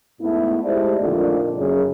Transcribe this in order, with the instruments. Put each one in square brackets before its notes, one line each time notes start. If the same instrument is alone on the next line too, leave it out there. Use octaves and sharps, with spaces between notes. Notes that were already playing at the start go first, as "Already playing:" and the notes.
[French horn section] G#2 A3 B3 E4
G#3 A3 E4 G4 C5 D5
F2 A#2 D3 D#3 A3 F4
F#2 C#3